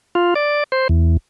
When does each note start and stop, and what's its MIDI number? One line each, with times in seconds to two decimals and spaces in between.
0.15 0.34 65
0.35 0.64 74
0.72 0.88 72
0.89 1.17 40